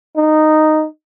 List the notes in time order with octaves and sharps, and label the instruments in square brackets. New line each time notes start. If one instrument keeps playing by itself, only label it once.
[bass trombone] D#4